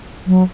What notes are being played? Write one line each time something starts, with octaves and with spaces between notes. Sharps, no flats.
F#3